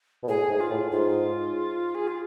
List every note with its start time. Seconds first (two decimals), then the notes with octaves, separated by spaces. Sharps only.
0.23 B2
0.28 A2 G#4
0.50 G#2
0.60 F4
0.70 A2
0.91 G#2 F4
1.95 G#4
2.08 F4